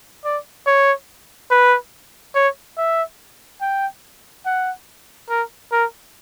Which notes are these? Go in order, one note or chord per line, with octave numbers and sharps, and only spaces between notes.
D5
C#5
B4
C#5
E5
G5
F#5
A#4
A#4